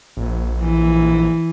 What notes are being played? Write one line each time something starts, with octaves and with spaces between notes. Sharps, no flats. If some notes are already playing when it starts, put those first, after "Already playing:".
A#1
E3